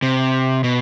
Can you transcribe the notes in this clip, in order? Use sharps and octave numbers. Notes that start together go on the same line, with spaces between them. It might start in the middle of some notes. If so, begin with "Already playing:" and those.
C3
B2